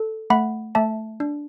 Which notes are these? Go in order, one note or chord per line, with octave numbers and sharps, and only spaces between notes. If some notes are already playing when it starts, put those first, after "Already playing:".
Already playing: A4
A3 F#5 B5
A3 E5 A5
D4